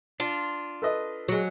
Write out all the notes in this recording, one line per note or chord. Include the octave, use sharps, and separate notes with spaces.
D4 F4
A4 B4 D#5
F#3 G#3